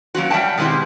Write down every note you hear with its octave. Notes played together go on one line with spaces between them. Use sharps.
F#3 A#3 C#4 F#4
G3 E5 F#5 G5 A5
B2 D#3 G#3 C4 E4 G4